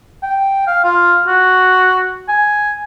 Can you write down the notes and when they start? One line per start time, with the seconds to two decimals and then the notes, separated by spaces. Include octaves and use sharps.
0.23 G5
0.67 F5
0.84 F4
1.28 F#4
2.28 G#5